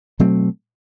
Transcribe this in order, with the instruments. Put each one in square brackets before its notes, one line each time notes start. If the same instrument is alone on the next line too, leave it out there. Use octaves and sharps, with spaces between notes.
[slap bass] B2 F#3 A3 C4